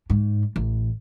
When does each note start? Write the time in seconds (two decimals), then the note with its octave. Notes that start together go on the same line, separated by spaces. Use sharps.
0.10 G#2
0.56 A1